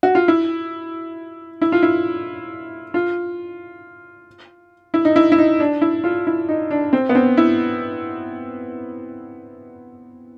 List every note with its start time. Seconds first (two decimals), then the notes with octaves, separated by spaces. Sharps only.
0.03 F#4
0.15 F4
0.28 E4
1.62 E4
1.72 F4
1.83 E4
2.94 F4
4.94 E4
5.05 D#4
5.16 E4
5.32 E4
5.38 D#4
5.60 D4
5.81 E4
6.04 F4
6.27 E4
6.49 D#4
6.71 D4
6.93 C4
7.09 B3
7.15 C4
7.37 E4